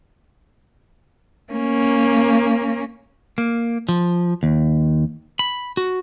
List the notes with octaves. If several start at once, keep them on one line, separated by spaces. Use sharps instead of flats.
A#3 C#4
A#3
F3
D#2
B5
F#4